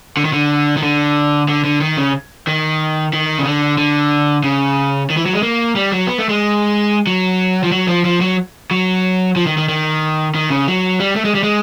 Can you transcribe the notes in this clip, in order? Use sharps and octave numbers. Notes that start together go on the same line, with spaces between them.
D3
D#3
D3
D#3
D3
D3
D3
D#3
C#3
D#3
D#3
C#3
D3
D3
C#3
D#3
E3
F#3
G#3
A#3
G3
F#3
B3
A3
G#3
F#3
F3
F#3
F3
F3
F#3
F#3
F3
D#3
D#3
D#3
D#3
C#3
F#3
G3
A3
G#3
G3
G#3